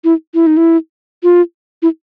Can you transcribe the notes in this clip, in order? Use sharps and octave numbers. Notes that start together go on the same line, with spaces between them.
E4
E4
D#4
E4
F4
E4